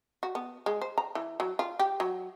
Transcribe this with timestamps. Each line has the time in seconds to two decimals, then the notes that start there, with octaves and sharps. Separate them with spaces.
0.23 F#4
0.35 B3
0.66 G#3
0.82 C5
0.98 A#5
1.15 E3
1.40 F#3
1.59 F4
1.79 G4
2.00 F#3